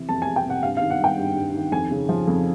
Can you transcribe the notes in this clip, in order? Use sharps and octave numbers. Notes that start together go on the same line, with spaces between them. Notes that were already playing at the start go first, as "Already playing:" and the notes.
Already playing: C3 E3
F2 A5
G#3 G#5
G5
C3 F#5
G2 F5
F5
D#3
F#5
G3 G5
G2
G2
D#3
F2 G#5
C#3
F3
F2